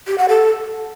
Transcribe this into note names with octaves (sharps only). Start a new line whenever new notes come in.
G4
F#5
A4